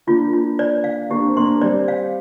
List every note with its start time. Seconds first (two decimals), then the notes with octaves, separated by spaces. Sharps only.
0.07 A#3 D4 F4
0.33 F4
0.59 D5
0.84 F5
1.10 A#3 D4 G4
1.26 C4
1.37 A#3 D4 C6
1.61 G3 C4 D5
1.88 F5